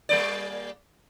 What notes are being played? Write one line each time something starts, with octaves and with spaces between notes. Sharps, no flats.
G3 A#3 D5